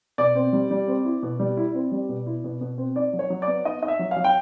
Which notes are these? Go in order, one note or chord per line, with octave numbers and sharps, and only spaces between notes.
B2 D5
C4
G3
G3
C4
E4
B2
G3
E4
C4
G3
B2
E4
B2
B2
C4
D#4 D5
F#3
C#5
F#3
D5
B3
D#4 D#5
D#4 D#5
E5
F#3
F5
F#3
G5